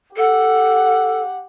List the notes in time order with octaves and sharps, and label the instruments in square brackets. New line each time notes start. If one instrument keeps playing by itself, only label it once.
[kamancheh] G4 F#5 [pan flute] A4